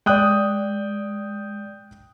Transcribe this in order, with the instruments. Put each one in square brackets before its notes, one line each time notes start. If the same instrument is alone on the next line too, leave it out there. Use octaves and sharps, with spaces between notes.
[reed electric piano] G#3 D5 [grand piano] G5 D#6 F#6